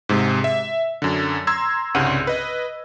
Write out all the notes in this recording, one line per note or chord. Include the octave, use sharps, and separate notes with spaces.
G#2 C3 G#3
E5
F#2 D3
A#5 C6 E6 G#6
C2 G2 C#3 F#5 C6 D#7
B4 D#5